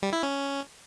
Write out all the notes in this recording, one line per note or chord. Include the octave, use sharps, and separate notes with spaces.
G3
E4
C#4